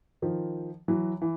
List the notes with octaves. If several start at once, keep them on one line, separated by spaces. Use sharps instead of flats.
D#3 F3
E3 F#3
E3